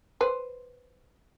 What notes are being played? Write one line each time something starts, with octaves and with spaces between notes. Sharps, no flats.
B4 C5